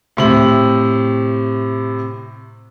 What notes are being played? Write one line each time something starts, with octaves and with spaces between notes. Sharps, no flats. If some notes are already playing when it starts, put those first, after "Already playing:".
A2 C3 F#7